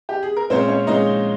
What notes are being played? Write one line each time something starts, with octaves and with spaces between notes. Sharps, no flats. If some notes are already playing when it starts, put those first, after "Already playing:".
G4
G#4
A#4
A#2 G#3 C4 C#4 C5
C#4 C#5
A#2 G#3 C#4 D#4 D#5